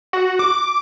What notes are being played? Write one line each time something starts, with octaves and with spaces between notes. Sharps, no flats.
F#4
D6